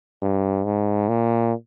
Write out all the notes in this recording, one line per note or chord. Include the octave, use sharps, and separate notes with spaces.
G2
G#2
A#2